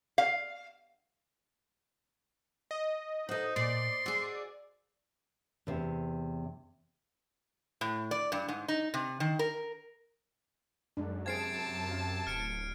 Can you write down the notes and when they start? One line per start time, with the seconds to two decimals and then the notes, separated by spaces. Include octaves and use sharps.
0.18 F5
2.71 D#5
3.29 D#4 F#4 A4 C5 D#5 A#5
3.56 A#2 D5 C6
4.06 F#4 G#4 E6 A6 C7
5.67 E2 C3
7.81 A2
8.11 D5
8.32 G2
8.48 G#2
8.68 D#4
8.94 C3
9.20 D#3
9.39 A#4
10.97 F#2 G#3 D4
11.26 C3 G#4 C5 F5 A5 G#6 C7 D7
11.91 C#4 F5
12.27 D1 F6 C#7 D7